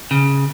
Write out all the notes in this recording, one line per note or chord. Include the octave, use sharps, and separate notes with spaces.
C#3